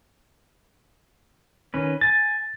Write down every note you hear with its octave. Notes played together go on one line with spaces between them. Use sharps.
D#3 C#4 B4
G#5 A6